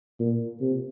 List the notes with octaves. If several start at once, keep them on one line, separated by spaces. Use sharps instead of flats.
A#2
C3